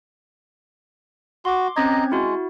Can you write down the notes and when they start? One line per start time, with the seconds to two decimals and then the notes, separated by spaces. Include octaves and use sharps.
1.45 F#4 C6 D6
1.77 C4 C#4 D#5 A#5 G#6
2.12 G#3 E4 F#4